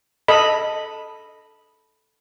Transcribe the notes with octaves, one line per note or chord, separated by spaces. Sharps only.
A4 D#5 B5